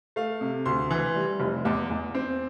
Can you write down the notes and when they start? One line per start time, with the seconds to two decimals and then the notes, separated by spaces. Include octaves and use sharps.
0.16 A3 F5
0.41 C3
0.66 D2 C6
0.91 E3
1.16 G3
1.40 F1
1.65 E2 D6
1.90 E2
2.15 C4